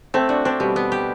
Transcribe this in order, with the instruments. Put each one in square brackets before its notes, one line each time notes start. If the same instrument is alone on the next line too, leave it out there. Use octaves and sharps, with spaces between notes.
[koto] A3 [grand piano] C4
[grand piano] D4 [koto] F#4
[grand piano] C4 [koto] D4
[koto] B2 [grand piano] G3
[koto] B3
G4